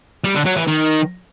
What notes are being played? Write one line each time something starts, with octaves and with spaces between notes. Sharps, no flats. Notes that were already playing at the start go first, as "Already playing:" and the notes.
G3
D3
F#3
E3
D#3